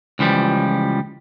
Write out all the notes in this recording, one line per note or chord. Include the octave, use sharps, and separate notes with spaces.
C#2 E3 F3 G3